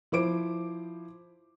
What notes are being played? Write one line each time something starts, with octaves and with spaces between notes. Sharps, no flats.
F3 E4 C5 D6 D7